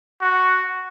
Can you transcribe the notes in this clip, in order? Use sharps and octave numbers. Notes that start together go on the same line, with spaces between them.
F#4